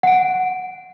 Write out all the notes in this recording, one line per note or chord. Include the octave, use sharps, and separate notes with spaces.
F#5 D7